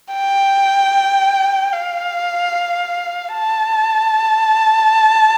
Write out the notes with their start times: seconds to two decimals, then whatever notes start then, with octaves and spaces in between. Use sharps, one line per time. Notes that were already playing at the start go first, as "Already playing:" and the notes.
0.13 G5
1.73 F5
3.34 A5